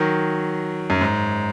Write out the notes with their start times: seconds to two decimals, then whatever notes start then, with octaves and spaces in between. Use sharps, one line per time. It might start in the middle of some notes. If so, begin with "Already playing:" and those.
Already playing: D#3 F#3
0.90 F#2
1.01 G#2